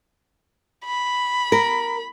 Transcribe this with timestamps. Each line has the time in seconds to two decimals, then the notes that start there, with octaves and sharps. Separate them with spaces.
0.86 B5
1.52 A#4